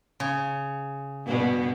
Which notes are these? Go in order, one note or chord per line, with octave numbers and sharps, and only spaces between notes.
C#3
G2 B2 B3